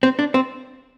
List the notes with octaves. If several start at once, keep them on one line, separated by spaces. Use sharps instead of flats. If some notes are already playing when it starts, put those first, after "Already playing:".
C4
D4
C4